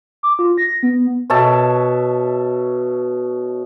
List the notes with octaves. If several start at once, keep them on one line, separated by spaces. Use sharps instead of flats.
D6
F4
A#6
B3
B2 C#5 E5 A5